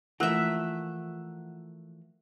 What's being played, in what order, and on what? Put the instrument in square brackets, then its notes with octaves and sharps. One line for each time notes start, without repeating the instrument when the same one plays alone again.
[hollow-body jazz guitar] E3 F3 A#3 [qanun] A3 E5 [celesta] F#5 E6 F#6